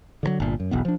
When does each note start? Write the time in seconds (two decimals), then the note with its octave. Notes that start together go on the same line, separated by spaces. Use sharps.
0.23 D3 D#3 F#3
0.40 G1 A#2
0.60 F#2
0.71 E1 B1 B3
0.85 F3 D4